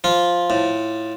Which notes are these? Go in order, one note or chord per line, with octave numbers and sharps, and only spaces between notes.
F3 F4
A2